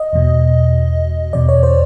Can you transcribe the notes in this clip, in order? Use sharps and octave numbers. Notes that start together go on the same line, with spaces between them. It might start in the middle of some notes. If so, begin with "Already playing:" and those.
Already playing: D#5
E2 B2
E2 B2 D5
C#5
C5